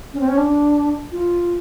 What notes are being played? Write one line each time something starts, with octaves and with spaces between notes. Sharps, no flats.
C#4
C4
C#4
D4
F4